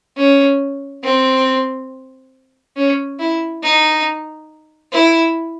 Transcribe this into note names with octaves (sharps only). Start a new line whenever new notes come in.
C#4
C4
C#4
E4
D#4
E4